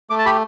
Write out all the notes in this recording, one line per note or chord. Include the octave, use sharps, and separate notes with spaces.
A3 D6
A5
G4 B5